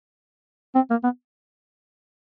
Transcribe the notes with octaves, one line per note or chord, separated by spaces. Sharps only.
C4
A#3
B3